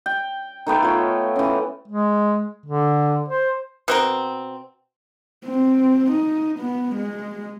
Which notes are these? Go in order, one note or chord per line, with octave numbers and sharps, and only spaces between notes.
G5
D#3 A3 B3 G5
F4 C#5
E3 C#4
G#3
D3
C5
B2 C4 A#4
C4
D#4
B3
G#3